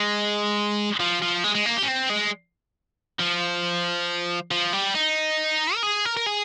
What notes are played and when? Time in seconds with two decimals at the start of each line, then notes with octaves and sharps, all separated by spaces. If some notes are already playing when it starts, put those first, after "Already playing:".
Already playing: G#3
1.00 F3
1.22 F3
1.44 G#3
1.55 G#3
1.66 A#3
1.77 G4
1.83 C#4
1.88 C4
2.10 G#3
3.19 F3
4.51 F3
4.73 G3
4.95 D#4
5.75 A#4
5.83 G#4
6.05 A#4
6.17 A#4
6.26 G#4